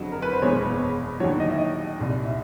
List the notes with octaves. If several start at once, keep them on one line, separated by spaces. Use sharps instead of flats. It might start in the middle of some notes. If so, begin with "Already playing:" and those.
Already playing: F#1 F2 D3 F#3
A#4
B4
C5
F#1 E2 B2 G#3 C#5
D#2 D3 F#3 C#5
D#5
E5
D#5
C2 A#2 G3
E5